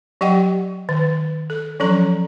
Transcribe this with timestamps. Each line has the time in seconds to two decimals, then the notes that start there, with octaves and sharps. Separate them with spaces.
0.21 F#3 G4 D#5 F#5 G5
0.89 D#3
1.50 A4
1.80 F3 F#3 C#4 A4 A#5